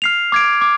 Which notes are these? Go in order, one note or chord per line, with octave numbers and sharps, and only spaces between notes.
F6 C7 F7
D6 G#6 D7
D6